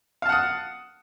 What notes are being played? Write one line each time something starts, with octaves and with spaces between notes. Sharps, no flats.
F5 F#5 A5 D#6